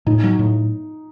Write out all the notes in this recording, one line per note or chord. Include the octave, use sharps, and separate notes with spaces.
A2 D#4
F#3
A2